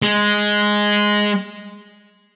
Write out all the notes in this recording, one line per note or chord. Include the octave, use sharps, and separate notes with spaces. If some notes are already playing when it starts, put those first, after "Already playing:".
G#3